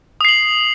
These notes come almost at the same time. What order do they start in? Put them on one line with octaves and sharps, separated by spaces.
D#6 C7 F#7